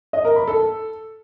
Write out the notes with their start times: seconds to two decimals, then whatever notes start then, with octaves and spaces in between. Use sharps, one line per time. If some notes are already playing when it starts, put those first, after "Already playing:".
0.13 D#5
0.25 A#4
0.36 B5
0.48 A4